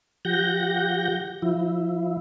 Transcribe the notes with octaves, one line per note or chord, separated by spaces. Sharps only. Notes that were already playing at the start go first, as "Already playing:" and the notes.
F3 G4 F#5 G6 A#6
F3 E4